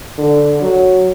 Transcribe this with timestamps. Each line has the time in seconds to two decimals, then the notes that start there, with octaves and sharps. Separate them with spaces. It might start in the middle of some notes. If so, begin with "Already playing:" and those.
0.18 D3
0.62 F#3